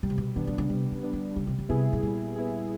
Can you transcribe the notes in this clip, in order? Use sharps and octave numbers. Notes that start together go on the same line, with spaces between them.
B2 G3
C3
B2
D#3 B3 D4
D3
C#3
C3 G3
C#3
B3 D4
D3
C#3 G3
C3
C#3
C3 B3 E4 G#4
B2
A#2 G3
B3 E4 G#4